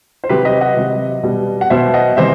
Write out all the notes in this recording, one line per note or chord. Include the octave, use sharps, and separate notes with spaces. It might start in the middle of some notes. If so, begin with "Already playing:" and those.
C5
C3 F#3 G4 B4
B4 D#5
D#5 F#5
C3 F#3
B2 G3
F#5
B2 F#3 C5 E5
D#5 F#5
C3 E3 G3 C5 E5